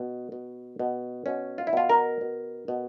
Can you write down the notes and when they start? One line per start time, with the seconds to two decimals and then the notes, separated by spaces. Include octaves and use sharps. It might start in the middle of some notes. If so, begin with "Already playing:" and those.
Already playing: B2
0.32 B2
0.79 B2
1.26 B2 C#4
1.58 F4
1.67 E4
1.73 B2 F4
1.89 A#4
2.21 B2
2.68 B2